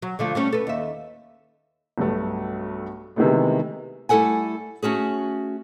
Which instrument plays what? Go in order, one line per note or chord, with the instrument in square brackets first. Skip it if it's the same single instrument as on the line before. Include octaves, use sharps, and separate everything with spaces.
[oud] F#3
D3 F3 A3
G3 A3 C#4
A4 B4
D#2 E5
[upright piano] B1 G2 A3
C3 D#3 E3 G#3 A3 B3
[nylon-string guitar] G3 A3 E4 A4 F#5 G#5
A3 C#4 F#4 G#4